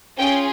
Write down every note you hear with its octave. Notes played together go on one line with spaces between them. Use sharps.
C#4 F4 G#4 G5